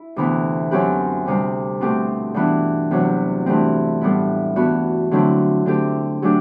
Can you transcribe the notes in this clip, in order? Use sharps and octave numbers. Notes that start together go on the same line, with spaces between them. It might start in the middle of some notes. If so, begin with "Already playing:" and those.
Already playing: E4
D2 C3 E3 B3
F#2 F#3 C4 G4 B4
D2 C3 G3
B2 A3 C4 G4
G2 E3 B3 D4
E2 C3 F#3
G2 E3 A3 C4
A2 G3 B3 E4
G2 E3 B3 F#4
D3 F#3 A3 C4 E4
D3 A3 C4 G4
F#3 A3 D4 G4